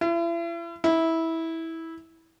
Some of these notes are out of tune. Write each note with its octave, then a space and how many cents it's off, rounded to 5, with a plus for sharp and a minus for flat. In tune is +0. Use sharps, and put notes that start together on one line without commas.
E4 +40
E4 -15